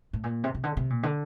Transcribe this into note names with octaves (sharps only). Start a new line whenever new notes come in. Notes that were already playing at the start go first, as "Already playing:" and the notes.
A2
A#2
C3
C3
D3
C3
A#2
D3